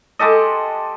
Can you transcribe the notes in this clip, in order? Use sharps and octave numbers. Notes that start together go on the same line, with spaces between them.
G#3 G4 A4 D#5